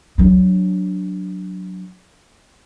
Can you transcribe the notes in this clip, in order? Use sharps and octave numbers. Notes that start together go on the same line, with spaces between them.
F#3 D4